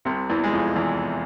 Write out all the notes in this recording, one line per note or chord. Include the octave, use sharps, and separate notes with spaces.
C2 C3
E2 E3
G#3
F2 F3
E2 E3